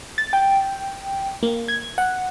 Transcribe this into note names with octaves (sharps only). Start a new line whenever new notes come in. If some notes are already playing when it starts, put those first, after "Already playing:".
A6
G5
A#3
G#6
F#5